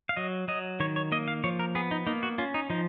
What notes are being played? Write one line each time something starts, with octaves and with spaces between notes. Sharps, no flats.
F5
F#3 D#5
F#3 D#5
D#3 C#5
C#5
A#3 D#5
F5
F3 C#5
A#4
B3 G#4
D#4
A#3 D#4
F#4
C#4 F4
D#4
F3 D#4